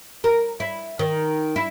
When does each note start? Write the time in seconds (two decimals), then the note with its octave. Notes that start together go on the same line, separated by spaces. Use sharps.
0.24 A#4
0.60 E4
0.99 D#3
1.56 E4